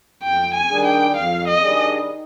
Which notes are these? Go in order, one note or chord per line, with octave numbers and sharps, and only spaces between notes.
F2 G5
G#5
D#3 G3 D4 G#4
G5
F2 F5
D#5
D#3 G3 D4 G#4
D#3